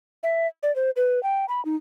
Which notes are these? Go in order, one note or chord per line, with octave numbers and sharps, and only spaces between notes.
E5
D5
C5
B4
G5
B5
D#4